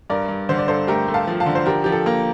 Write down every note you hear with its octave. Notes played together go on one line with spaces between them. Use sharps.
G2 A#4 D5
G2
D3 C5
D5
G2 A4 C5
A3 G4 A#4
A3
F5 A5
F3
F5 A5
D3
C5
F3 G4 A#4
F3 G4
A4
A#3